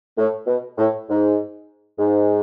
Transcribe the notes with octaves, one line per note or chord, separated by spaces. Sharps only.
A2
B2
A2
G#2
G#2